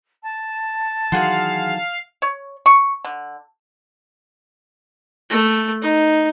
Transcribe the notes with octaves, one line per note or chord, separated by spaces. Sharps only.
A5
D#3 E3 F#3 G#4 F5 F#5 C6
C#5
C#6
D3
A3
D#4